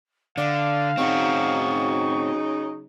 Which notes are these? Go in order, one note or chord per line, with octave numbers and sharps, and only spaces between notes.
D3 D5 F5
C#3 F#3 C4 D#4 F#4 C#6